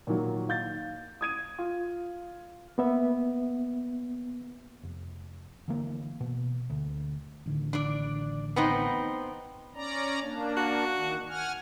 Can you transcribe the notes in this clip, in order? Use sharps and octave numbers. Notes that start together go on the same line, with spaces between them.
A#2 D#3 F#3
F5 G6 A6
D#6 G#6 D#7
F4
A#3 B3 E5
F1
D3 E3 A#3
B2
D2
A1 D3 D#3
D4 D5
B3 C4 D#4
C#4 D5 A#5
A#3 D4
F#4
D#3
F#5 G#5 F6